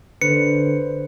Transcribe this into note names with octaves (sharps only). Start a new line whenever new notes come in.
D3 B4 C5 C#7